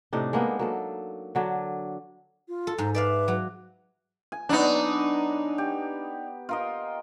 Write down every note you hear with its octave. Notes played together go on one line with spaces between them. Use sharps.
A2 C3 D4 D#4
G#3 A#3 B3
F#3 A#3 A4
D3 F#3 D4
F4
A4
G#2 A#5
B4 D5 E5 F5
F#3
G#5
F#3 B3 D4 D#4
G4
F4 A#4 D#5